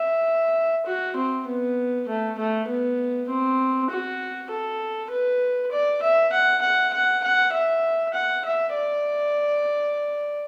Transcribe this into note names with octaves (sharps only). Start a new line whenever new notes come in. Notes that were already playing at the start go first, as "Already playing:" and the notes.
Already playing: E5
F#4
C4
B3
A3
A3
B3
C4
F#4
A4
B4
D5
E5
F#5
F#5
F#5
F#5
E5
F#5
E5
D5